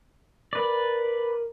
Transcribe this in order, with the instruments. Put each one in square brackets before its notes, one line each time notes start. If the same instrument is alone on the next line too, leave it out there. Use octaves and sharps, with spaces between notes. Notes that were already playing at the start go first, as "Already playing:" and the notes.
[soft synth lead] A#4 [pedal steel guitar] B4 D5